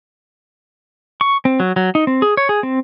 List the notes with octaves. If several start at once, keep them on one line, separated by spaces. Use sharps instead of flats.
C#6
C4
F#3
F#3
D#4
C4
G#4
C#5
G#4
C4